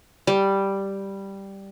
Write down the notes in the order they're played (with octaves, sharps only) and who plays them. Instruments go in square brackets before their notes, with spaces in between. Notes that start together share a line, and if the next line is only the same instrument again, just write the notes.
[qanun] G3